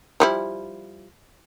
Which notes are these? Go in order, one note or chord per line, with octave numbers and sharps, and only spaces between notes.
F3 G3 E4